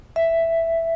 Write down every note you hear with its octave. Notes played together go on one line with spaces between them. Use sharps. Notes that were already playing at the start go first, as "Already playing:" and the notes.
E5